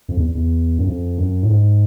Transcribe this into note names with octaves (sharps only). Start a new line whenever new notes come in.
F2
E2
E2
F#2
F2
F#2
A2
G#2